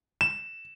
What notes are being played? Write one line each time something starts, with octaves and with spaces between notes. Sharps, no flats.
E7